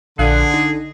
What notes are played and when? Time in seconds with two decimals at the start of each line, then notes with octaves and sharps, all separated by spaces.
0.19 A#1 D3 G#4 F5 F#6
0.54 D#4